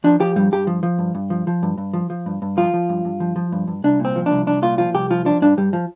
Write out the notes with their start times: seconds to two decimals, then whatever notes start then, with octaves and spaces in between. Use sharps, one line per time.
0.04 F3 D4
0.20 F3 G4
0.36 G2 G3
0.52 G2 G4
0.67 F3
0.83 F3
0.98 G2
1.15 G2
1.30 F3
1.47 F3
1.63 G2
1.78 G2
1.93 F3
2.10 F3
2.26 G2
2.42 G2
2.57 F3 F4
2.74 F3
2.89 G2
3.05 G2
3.20 F3
3.36 F3
3.52 G2
3.68 G2
3.84 C2 D4
4.00 A#2
4.05 C4
4.16 F3
4.26 D4
4.31 C2
4.47 C2 D4
4.62 A#2 F4
4.78 F3 F4
4.94 C2 G4
5.10 F3 F4
5.25 F3 D4
5.42 G2 D4
5.57 G2 G3
5.73 F3